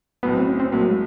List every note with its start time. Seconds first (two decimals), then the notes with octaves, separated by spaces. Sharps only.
0.23 B1 A2 F#3 B3
0.35 C4
0.47 C#4
0.60 C4
0.72 B1 A2 F#3 A#3
0.88 G#3